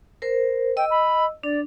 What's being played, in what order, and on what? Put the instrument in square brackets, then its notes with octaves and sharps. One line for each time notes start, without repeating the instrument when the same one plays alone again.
[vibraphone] A#4 C5
[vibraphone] D#5 E6 [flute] G5
[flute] B5
[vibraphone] D4 [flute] D5